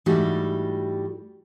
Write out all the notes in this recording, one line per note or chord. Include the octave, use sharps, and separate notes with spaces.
G#2 E3 G3 A3 F#4 G4